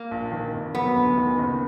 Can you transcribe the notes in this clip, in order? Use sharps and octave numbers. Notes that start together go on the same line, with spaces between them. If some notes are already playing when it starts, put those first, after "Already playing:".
Already playing: A#3
A#1
D#3
F1
F#3 B3
D2
D#3
F#1